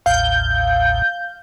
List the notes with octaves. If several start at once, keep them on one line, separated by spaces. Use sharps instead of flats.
A1 D#2 A2 F5 G6